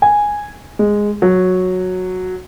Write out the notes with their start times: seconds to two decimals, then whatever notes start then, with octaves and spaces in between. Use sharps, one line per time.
0.02 G#5
0.79 G#3
1.22 F#3